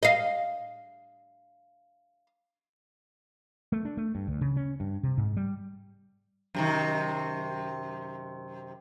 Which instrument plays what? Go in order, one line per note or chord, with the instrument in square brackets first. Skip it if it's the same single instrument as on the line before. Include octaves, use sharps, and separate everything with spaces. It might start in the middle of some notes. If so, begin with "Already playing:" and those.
[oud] D#5 F5
[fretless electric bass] A3
D4
A3
G2
D2
C#3
C#4
G2
C3
G#2
G3
[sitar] F#2 C3 D#3